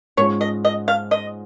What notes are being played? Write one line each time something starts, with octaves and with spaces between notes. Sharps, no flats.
G#2 G#3 C#4 F4 C#5
D#5
D#5
F5
D#5